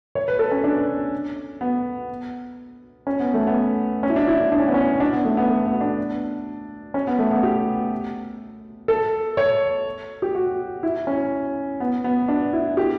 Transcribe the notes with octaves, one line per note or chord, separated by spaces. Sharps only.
C#5
B4
A4
C#4
D4
B3
C#4
B3
A3
B3
C#4
E4
D4
E4
D4
D4
C#4
B3
C#4
D4
B3
A3
B3
A3
B3
D4
C#4
B3
A3
B3
G4
A4
C#5
G4
F#4
E4
C#4
B3
B3
D4
E4
G4